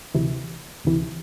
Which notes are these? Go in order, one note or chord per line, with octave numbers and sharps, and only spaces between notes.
D2 C3 E3
D2 C3 E3